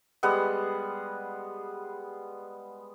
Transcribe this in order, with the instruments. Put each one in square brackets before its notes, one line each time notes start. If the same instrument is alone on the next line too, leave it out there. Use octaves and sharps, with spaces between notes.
[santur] G3 G#3 B3 F#5